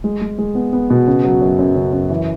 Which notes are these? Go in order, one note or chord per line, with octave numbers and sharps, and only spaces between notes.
G#3
G#3
G#3
B3
B3
B2
C#3
F#3
F#2
F#2
C#3
F#2
E3